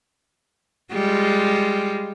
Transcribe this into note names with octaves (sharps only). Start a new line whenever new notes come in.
G3 G#3 F4